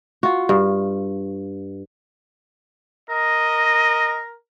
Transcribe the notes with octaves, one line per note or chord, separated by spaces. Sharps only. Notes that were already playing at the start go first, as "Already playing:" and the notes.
F4 F#4
G2
A#4 D#5